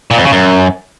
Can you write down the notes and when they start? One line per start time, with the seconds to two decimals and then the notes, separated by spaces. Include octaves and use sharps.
0.11 A#2
0.18 F2
0.25 C#3
0.32 F#2